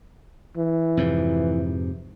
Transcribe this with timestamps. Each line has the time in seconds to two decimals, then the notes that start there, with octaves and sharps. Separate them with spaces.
0.57 E3
0.97 F2 G#2 C3